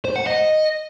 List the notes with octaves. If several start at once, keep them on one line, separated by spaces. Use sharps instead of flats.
C5
F#5
D#5